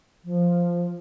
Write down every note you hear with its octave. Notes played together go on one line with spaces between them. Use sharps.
F3